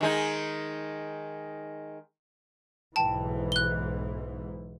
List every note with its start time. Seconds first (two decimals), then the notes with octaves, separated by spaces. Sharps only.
0.01 D#3 G#3 D#4
2.96 B1 G#2 E3 G5 A5
3.52 F#6 G7